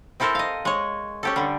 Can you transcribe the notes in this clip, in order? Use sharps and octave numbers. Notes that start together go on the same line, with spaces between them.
C4 E4 A4 A#4 C5
D#5 F5
G#3 C#5
C#4 G4 A4
D3 G3